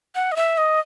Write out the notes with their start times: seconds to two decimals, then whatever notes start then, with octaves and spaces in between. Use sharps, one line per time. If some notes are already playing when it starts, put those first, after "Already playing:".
0.15 F#5
0.32 D#5
0.36 E5
0.58 D#5